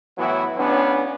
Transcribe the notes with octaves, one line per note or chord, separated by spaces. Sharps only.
A2 E3 F#3 B3 E4 F#4
C#2 B3 C#4 D4